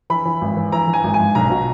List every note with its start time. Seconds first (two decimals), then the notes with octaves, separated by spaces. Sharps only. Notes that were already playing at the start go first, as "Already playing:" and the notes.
0.10 E3 B5
0.25 E3
0.41 G#1
0.57 E3
0.72 E3 A#5
0.88 E3
0.93 G#5
1.04 G#1
1.14 G#5
1.19 G#1
1.35 B1 A#5
1.50 B2